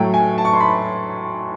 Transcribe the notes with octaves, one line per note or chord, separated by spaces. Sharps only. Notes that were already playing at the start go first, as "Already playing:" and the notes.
Already playing: A2 F#3 A3 G5
G#5
A5
C#6
C6
B5